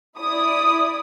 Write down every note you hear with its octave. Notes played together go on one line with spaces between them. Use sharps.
E4 D5 D#6